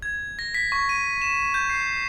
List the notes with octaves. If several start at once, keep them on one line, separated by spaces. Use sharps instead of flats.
G#6
A#6
B6
C#6
D#7
E7
G6
C7